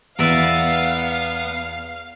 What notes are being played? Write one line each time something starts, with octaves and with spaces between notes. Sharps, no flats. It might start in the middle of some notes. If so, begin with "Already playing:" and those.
E2 B3 A#4 D5 E5 F5